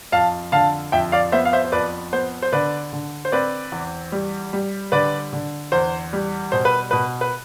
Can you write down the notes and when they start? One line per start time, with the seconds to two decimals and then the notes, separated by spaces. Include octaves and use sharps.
0.12 F2 F5 A5
0.52 D3 F5 A5
0.92 F2 E5 G5
1.12 D5 F5
1.32 B3 C5 E5
1.45 F5
1.53 C5 E5
1.64 C5
1.72 F2 B4 D5
2.13 B3 C5
2.42 C5
2.52 D3 B4 D5
2.93 D3
3.25 C5
3.32 C4 B4 D5
3.72 E2
4.12 G3
4.53 G3
4.92 D3 B4 D5
5.33 D3
5.72 E2 C5
6.13 G3
6.52 B2 C5
6.65 B4
6.91 B2 B4
7.21 B4